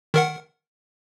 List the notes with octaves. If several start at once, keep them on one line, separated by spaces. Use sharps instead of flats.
D#3 A#4 F#5